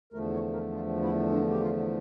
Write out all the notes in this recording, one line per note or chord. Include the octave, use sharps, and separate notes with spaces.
E2 D3 F3 A3 A#4
C#5
A#4
F4
E4
D4
G4
F4